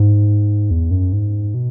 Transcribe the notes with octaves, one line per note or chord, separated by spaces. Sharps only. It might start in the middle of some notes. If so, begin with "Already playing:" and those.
Already playing: G#2
E2
F#2
G#2
B2